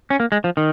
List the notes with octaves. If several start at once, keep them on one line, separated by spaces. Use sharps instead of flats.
C#4
A#3
G#3
F3
D#3